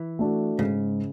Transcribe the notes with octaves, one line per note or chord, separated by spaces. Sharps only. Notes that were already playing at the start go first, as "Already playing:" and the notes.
Already playing: E3
A3 D4 F#4
G#2 C#3